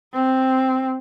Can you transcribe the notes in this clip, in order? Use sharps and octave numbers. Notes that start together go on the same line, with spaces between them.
C4